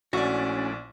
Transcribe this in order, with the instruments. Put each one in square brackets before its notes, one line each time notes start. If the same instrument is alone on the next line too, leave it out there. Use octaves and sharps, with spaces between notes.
[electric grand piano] A#1 D5 [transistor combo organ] A3 D4 E4 [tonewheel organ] C#4 [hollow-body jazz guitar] F#4